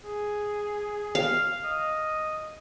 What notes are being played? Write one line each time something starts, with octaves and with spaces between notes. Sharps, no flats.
G#4
F5
D#5